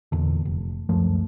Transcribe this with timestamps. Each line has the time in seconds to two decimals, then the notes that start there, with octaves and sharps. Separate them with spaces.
0.12 E2 A#2 D3
0.45 F1
0.89 C#2 F#2 F3 A3